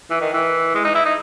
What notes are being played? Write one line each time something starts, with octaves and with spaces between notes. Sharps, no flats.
E3
D#3
E3
G#3
D#4
E4
D#4